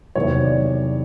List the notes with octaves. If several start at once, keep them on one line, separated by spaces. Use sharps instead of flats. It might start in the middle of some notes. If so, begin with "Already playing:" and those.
E2 C3 D#3 F#3 A#3 C#5
D5